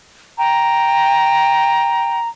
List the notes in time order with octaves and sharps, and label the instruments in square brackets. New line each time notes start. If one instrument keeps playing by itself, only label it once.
[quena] G5 [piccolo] A#5